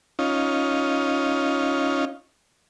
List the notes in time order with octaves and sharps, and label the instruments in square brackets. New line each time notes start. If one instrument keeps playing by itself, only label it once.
[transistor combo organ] C#4 D#4 F4